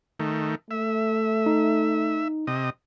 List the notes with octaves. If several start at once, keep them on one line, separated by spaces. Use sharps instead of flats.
D#3 A3
A3 E5
D#4
C3 D#5